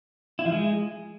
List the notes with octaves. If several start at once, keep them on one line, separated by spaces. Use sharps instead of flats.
E4
F3
G#3